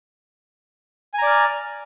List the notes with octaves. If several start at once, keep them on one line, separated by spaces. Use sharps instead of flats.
D5 G#5 A#5 F6